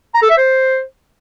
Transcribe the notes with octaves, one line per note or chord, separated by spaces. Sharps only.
A#5
A4
E5
C5